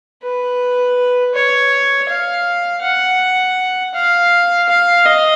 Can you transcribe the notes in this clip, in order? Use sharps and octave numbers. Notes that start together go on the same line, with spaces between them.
B4
C#5
F5
F#5
F5
F5
D#5